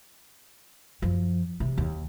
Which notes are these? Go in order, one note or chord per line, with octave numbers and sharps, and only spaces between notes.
F#2 F3
C3
D#2